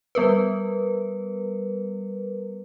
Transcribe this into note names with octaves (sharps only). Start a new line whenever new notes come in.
G3 B3 A#4 B4